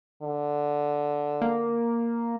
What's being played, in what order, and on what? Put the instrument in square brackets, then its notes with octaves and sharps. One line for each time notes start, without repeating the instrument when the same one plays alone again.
[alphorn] D3
[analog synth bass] A#3